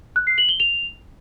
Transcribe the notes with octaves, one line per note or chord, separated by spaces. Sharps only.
F#6
C7
F#7
G7
F7